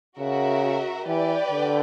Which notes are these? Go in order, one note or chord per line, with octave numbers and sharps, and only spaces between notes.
C#3 F#4 A#4 E5
E3 G4 B4 D5 G5
D3